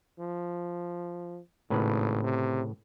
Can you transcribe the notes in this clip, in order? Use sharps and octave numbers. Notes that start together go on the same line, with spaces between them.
F3
G#1 A2 C#3 B4
C3